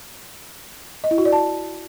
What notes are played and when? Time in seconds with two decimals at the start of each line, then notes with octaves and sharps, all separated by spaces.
1.04 D#5
1.11 E4
1.18 F#4
1.25 D5
1.33 A5